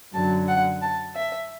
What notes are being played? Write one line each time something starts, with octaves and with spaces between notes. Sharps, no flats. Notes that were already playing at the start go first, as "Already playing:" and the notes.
F#2 D3 F#3 A5
F#5
A5
E5